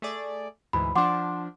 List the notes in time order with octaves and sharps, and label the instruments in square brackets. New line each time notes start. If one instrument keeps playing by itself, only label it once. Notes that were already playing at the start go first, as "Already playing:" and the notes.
[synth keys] A3 G#4 D5
[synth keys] D2 G#2 E3 [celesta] B5
[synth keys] F3 D4 [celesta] F#5 C6 D6